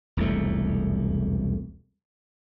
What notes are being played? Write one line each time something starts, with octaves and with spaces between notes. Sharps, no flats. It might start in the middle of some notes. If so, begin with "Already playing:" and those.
E1 C2 F2 A3